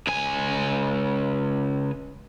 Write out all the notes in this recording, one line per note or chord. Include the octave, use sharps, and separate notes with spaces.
C#2 G#5